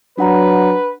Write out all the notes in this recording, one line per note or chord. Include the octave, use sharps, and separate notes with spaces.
F#3 D4 B4 F#5 A#5